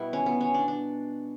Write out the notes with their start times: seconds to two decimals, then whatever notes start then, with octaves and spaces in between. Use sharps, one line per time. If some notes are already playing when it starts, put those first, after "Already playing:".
Already playing: B2 G3 B3 E4
0.13 C#4
0.26 B3
0.41 C#4
0.54 D4
0.68 D4